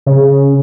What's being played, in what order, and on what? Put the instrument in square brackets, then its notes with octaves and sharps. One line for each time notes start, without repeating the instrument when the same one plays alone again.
[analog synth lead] C#3